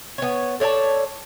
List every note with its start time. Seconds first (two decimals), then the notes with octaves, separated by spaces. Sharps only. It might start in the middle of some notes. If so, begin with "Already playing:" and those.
0.18 B3 C#5
0.60 A4 C#5 D5 A5